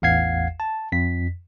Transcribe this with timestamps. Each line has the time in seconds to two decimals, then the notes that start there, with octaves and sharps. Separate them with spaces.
0.02 A1 E2 F5 F#5 G#6 C7
0.60 A5
0.92 F2 B6